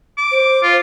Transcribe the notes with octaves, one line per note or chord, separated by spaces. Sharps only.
D6
C5
F4